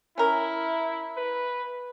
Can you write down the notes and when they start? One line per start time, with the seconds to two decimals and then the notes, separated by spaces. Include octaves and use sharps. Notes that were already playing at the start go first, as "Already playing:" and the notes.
0.18 C#4 E4 A#4
1.17 B4